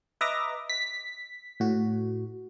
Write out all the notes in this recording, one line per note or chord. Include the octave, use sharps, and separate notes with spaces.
B4 D#5 E5 A#5 D6 A#6
B6
A2 F#4